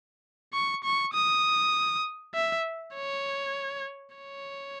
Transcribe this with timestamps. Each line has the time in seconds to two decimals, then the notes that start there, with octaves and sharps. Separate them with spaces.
0.54 C#6
0.84 C#6
1.14 D#6
2.35 E5
2.95 C#5
4.16 C#5